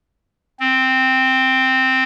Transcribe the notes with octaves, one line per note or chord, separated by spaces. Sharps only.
C4